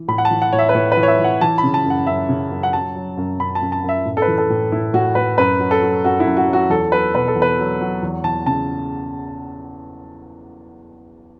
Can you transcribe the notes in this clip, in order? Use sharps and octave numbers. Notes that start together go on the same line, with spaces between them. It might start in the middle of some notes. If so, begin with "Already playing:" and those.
Already playing: E3
A2 B5
F#5
A5
E3
F#5
A2 C#5
E5
B4
A2 C#5
B4
E3
C#5
E5
E3
F#5
E3 A5
B5
C#3
A5
F#2
F#5
F#2 E5
C#3
F#2
F#5
F#3 A5
F#3
F#2
F#2 B5
A5
F#2
A5
F#2
E5
A2
A4
B4
E3
A4
A2
A2 E4
A2 F#4
A2 B4
F#2 B4
F#3
A4
F#3
F#2 F#4
E4
F#2
F#4
F#3
F#4
E2 A4
F#3 B4
B2 B4
A4
E2
B4
F#3
F#3
E2
E2 A5
C#3 A5